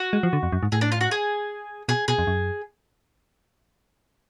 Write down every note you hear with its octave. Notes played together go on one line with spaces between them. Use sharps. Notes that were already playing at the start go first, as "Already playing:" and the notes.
Already playing: F#4
G#3
F3
D3
F2
F#2
G#2
A2 G#4
D4
F4
F#4
G#4
B2 G#4
B2 G#4
F2
F#2